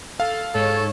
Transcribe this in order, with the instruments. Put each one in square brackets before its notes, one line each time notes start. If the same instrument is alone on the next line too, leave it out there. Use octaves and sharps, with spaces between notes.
[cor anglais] A4 [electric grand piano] F5
[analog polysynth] G#2 C#5 [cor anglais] A4